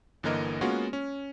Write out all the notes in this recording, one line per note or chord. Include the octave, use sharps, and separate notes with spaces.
G1 D3 E3 A#3 A#4 D#5
G#3 A#3 B3 C#4 F4 F#4
C#4